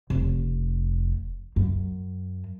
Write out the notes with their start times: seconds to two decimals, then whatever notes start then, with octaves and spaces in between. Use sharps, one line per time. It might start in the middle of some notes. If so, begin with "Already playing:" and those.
0.10 F1
1.56 F#2